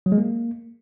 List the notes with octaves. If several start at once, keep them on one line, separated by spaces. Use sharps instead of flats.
F#3
G#3
A#3